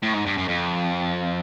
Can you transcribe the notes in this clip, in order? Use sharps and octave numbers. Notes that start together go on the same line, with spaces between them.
A2
G#2
G2
F#2
F2